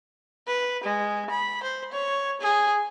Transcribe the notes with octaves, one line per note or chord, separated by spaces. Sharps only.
B4
G#3
B5
C5
C#5
G#4